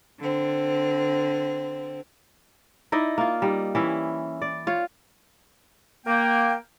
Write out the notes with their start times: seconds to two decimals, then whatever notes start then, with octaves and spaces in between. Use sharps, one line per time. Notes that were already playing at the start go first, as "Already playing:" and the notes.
0.20 D3 C4
2.92 D#4 E4 D5 D#5
3.18 A#3 F4
3.42 G3 D#4
3.75 E3 C#4 E4
4.42 D5
4.67 F4 C#5
6.06 A#3 G5